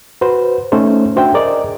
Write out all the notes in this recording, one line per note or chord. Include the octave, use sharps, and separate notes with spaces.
F#4 B4 C5
A3 C#4 D#4 A4 C5
D4 F#4 C5 E5 G5
G#4 A#4 D5 D#5